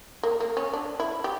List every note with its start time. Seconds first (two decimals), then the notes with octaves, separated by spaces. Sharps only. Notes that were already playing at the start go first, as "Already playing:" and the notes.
0.23 A#3
0.40 A#3
0.57 C#4
0.73 D4
1.00 E4
1.24 G4